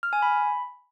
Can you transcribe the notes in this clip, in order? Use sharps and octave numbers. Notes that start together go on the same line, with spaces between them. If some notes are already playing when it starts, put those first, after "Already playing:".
F6
G#5
B5